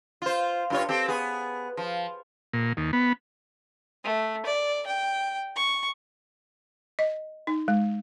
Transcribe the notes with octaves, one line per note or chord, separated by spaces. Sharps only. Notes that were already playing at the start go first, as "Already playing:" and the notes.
F4 C5
G2 F4 C#5
C4 G4 A4
B3 G#4
F3
A#2
D#2
B3
A3
D5
G5
C#6
D#5
D#4
G#3